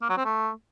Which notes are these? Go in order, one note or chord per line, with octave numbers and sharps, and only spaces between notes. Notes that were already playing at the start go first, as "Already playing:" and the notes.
A#3
F#3
C4
A3